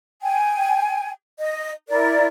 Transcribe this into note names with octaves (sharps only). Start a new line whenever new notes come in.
G5 G#5
D#5
E4 A#4 D5